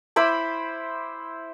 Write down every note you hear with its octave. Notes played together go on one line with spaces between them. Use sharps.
E4 C5 B5 D6